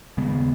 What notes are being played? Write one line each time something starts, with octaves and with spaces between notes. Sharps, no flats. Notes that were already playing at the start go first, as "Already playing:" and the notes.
D#2 C#3 G#3 B3